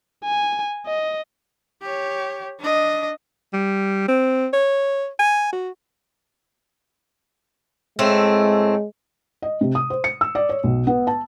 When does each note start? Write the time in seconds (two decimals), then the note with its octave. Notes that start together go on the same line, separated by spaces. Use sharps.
0.24 G#5
0.86 D#5
1.82 G4 C#5
2.60 D4 D#5
3.53 G3
4.08 C4
4.53 C#5
5.19 G#5
5.53 F#4
7.99 A2 G#3 A3 C4
9.42 D#5
9.61 C3
9.75 D#6
9.90 C5
10.04 C#7
10.21 E6
10.35 D5
10.49 C#5
10.64 B1
10.87 B3
11.07 A5